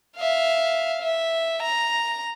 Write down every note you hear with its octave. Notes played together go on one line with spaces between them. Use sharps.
E5 F5
E5
A#5